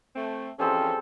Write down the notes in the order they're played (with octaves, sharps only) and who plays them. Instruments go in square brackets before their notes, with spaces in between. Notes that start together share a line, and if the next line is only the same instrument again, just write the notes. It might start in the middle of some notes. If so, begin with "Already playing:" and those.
[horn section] A3 C4
[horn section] E3 F3 C#4 [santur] G3 C4 G#4 [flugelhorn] A4